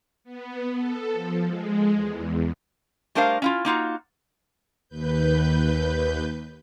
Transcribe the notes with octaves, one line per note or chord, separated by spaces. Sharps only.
B3
A4
F3
G#3
E2
G3 A3 D4 A#4 C5 F5
C#4 E4 F4
A#3 D#4 F4 F#4
D#2 B4 G6